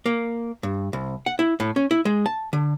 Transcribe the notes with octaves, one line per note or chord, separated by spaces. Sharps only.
A#3
G2
C2
F#5
E4
A2
C#4
E4
G#3
A5
D3